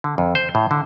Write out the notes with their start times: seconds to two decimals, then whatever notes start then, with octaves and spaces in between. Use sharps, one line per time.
0.04 D3
0.18 F2
0.35 C5
0.55 A2
0.71 D3